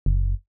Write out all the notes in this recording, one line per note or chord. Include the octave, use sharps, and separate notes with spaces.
F#1